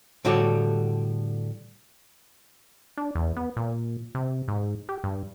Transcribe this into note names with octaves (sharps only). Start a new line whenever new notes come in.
A2 D3 G3 F#4 G4 A4
D4
E2
B3
A#2
C3
G#2
G4
G2